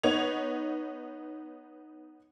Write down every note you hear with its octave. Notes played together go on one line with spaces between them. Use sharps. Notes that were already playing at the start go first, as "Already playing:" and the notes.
B3 D#4 C#5 G#6 F7